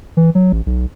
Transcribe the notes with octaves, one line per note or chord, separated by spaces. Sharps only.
E3
F#3
A1
B1